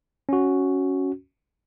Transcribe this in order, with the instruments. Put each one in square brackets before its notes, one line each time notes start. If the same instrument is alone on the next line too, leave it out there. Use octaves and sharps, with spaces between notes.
[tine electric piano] C#4 F#4